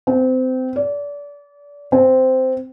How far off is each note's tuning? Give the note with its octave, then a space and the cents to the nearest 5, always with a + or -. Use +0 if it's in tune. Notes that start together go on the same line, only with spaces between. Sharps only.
C4 -25
D5 -30
C4 -10